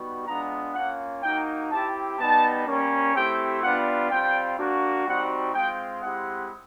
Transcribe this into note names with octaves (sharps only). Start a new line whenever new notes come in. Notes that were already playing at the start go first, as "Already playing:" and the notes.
Already playing: G3 B3 D#4 F#4
G#3 B3 D4 F4 A#5
A#3 C#4 F4 F#5
A#3 D#4 F#4 G5
C4 E4 G4 A5
G3 B3 D#4 A5
G3 A#3 C#4
A3 C4 E4 G4 G5
G3 B3 D4 F4 F#5
G3 C4 F4 G5
A#3 D4 F#4
G3 C4 D#4 F#4 F#5
G#3 C4 F4 G5
G#3 C4 E4 G4 F#5